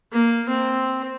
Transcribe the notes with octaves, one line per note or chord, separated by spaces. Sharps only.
A#3
C4